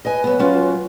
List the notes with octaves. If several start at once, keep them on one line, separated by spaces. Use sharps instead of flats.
B4 D#5 G#5
F#3 B3
F#3 C#4 F4